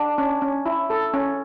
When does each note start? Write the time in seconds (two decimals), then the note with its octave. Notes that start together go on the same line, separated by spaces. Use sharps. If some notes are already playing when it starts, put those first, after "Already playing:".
Already playing: D4
0.18 C#4
0.42 C#4
0.66 E4
0.90 A4
1.14 C#4